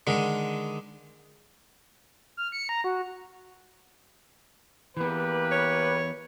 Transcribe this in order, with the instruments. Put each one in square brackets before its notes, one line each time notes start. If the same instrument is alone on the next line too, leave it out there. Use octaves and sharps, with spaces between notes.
[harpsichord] D3 D#3 G#3
[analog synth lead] F6
C#7
A#5
F#4
[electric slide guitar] E3 B3 [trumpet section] A#3 G4 B4
[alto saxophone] C#5